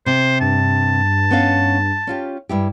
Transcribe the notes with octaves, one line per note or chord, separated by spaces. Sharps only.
C3 C5
G2 A5
B3 C#4 F5
C#4 F4 G4
G2 E4 G4